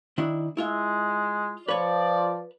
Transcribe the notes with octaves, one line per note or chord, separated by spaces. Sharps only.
D#3 D4 E4
G#3 E4 F4 E5
F3 B4 C#5 D5